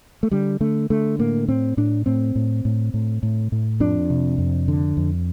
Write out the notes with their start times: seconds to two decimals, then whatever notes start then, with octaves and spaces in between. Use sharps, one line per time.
0.23 A3
0.31 D3 G3
0.60 D3 A3
0.90 D3 A3
1.19 A2 A#3
1.48 A2 C4
1.77 A2 D4
2.06 A2 C4
2.35 A2
2.65 A2
2.94 A2
3.23 A2
3.52 A2
3.80 F2 D4
4.10 C3
4.38 F2
4.68 D3
4.97 F2